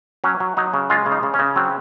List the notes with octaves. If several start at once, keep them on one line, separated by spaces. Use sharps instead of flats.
F#3 C#4
F#3
F#3 D#4
C#3
G#3 F4
C#3
D#4
C#3
C#4
C#3
F#3 C4